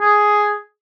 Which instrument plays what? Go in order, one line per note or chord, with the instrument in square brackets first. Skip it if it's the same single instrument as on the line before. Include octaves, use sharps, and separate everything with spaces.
[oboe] G#4